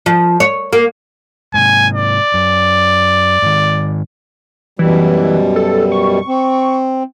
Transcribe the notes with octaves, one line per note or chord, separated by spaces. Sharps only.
F3
C#5
A#3
G#2 C3 G#5
D5
F#2
G#2 D#3
F#2 B2 E3 G3
A4
C#6
C4